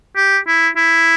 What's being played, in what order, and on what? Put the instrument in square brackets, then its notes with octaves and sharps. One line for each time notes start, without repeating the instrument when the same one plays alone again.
[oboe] G4
E4
E4